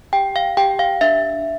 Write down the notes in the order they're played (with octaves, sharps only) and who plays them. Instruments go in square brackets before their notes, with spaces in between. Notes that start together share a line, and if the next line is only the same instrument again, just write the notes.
[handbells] G4 G5
F5
G4 G5
F5
D4 E5